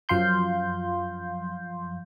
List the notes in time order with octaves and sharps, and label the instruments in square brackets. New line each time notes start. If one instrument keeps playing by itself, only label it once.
[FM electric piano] F#2 F3 F5 C6 G6